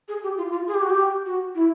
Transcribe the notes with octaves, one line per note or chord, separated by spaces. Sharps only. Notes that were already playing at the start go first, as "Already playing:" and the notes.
G#4
G4
F4
F4
G#4
G4
F#4
G4
F#4
E4